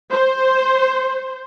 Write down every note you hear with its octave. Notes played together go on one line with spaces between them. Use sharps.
C5